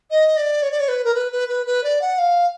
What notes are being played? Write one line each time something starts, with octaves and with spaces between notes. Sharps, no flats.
D#5
D5
C#5
D5
C#5
B4
A#4
B4
B4
B4
B4
D5
F#5
F5